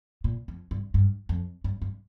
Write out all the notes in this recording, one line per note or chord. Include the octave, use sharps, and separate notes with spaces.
A#2
F2
G2
G2
F2
G2
G2